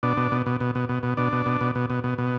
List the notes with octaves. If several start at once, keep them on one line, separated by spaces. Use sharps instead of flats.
B2 D4
B2
B2
B2
B2
B2
B2
B2
B2 D4
B2
B2
B2
B2
B2
B2
B2